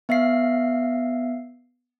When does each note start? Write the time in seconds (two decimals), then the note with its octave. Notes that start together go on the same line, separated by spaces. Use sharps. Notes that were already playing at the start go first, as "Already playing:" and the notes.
0.09 B3 E5 F5 C7